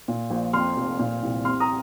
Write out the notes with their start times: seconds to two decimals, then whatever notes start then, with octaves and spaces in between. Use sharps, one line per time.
0.08 A#2
0.30 A#1
0.53 F2 C6 F6
0.76 F1
0.99 A#2
1.23 C2
1.45 C3 C6 F6
1.60 A#5 D#6